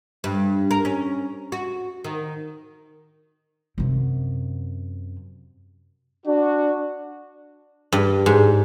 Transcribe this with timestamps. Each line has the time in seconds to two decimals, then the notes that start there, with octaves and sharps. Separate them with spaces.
0.24 G2
0.71 A#4
0.85 C#4
1.52 F#4
2.04 D#3
3.78 F#2 C3
6.26 D4 F#4
7.92 G2
8.26 G#2